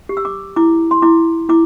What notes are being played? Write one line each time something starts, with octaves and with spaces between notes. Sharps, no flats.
G4
E6
D6
E4 D6
C6
E4 D6
E4 D6